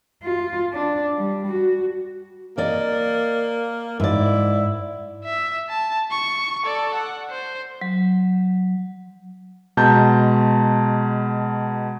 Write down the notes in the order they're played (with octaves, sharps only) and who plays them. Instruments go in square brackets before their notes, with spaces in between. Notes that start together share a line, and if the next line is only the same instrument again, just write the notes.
[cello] F4
D4
G3
F#4
[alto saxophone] A#3 [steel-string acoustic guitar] D5 D#5
[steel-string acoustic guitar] G#2 D5 [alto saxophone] E4
[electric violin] E5
A5
C#6
A4 D5
F#5
C5
[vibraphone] F#3
[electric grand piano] B2 G#3 A5 A#5 G6